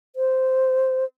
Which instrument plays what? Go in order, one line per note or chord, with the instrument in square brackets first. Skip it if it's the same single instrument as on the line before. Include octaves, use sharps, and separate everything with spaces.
[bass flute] C5